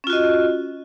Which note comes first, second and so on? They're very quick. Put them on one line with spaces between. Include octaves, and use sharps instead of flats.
C#4 F4 F#4 D#5